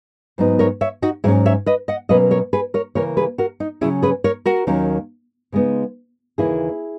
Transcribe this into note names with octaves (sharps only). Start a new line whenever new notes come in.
G#2 F#3 B3 D#4
A#4 C#5
C#5 E5
D#4 F#4
G#2 F#3 C#4 E4 G#4
C#5 E5
B4 D#5
D#5 F#5
B2 F#3 A#3 C#4 B4 D#5
A#4 C#5
G#4 B4
A#4 C#5
C#3 E3 A#3 A#4 C#5
G#4 B4
F#4 A#4
D#4
C#3 F#3 C#4 E4 G#4
G#4 B4
A#4 C#5
F#4 A#4
D#2 D#3 F#3 A#3 C#4
C#3 G#3 B3 D#4
D#2 C#3 E3 A#3 E4 G#4